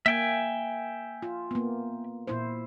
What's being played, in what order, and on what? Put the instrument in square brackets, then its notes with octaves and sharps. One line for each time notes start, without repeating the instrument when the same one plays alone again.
[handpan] A#3 [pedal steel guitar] E5 G5 G#5
[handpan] F4
A#3 B3
A#2 E4 C5